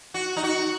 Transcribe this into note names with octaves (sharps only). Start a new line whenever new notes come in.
F#4
D#4
F#4